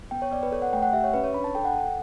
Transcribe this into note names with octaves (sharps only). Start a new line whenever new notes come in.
B3 G5
C#5
B3 D5
B4
A4 C#5
F#5
A3 G5
F#5
G4 E5
C#5
C#4 B4
C#5
D4 B5
A5
A4 G5
F#5
A4